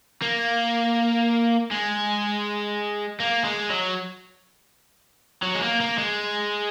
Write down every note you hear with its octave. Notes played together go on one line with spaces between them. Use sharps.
A#3
G#3
A#3
G#3
F#3
F#3
G#3
A#3
A#3
G#3